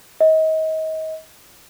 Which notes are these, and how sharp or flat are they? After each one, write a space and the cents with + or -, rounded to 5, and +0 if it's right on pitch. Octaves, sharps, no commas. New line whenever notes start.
D#5 +30